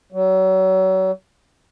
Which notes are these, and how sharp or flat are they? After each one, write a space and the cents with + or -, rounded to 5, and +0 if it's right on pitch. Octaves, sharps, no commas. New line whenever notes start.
F#3 +35